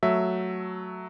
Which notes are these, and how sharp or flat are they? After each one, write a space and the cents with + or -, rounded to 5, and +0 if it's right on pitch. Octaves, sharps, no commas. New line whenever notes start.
F#3 +0 A3 +0 E5 +0